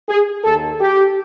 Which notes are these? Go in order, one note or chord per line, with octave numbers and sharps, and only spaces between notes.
G#4
D#2 D#3 A4
G4